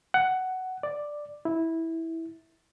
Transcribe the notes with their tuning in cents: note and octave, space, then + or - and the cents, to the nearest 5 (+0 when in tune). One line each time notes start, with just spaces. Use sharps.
F#5 +10
D5 +5
E4 -15